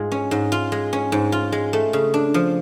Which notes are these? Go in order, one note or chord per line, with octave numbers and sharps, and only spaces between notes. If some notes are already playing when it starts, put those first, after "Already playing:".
Already playing: G#2 G#3 F4
C#4
G#2
F4
G#3
C#4
G#2
F4
G#3
A3
C#3
D4
F3